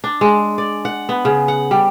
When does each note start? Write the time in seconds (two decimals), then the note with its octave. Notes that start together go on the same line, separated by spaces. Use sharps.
0.04 D4
0.21 G#3
0.58 D5
0.85 F#5
1.09 B3
1.25 C#3
1.48 F#5
1.71 G3